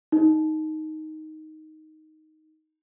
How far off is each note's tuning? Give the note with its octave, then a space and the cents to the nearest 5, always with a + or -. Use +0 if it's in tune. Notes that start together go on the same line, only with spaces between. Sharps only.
D#4 +5